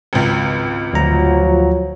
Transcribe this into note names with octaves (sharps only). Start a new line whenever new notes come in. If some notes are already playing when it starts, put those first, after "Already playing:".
G#1 C#2
D2 F3 F#3 A#5